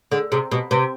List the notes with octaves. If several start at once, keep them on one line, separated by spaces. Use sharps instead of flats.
D3 G#4
C3 G#4
B2 G4
C3 B4